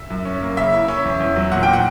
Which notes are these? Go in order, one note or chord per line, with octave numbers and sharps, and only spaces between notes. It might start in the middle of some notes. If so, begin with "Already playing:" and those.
Already playing: E5
F#2
C#4
A#3
C#3 E5
E4
C#4
E2
E2
F#3
A#2 F#5
A#2 G5
F#5